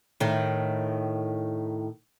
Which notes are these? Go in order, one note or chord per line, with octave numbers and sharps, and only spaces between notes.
A2 D#3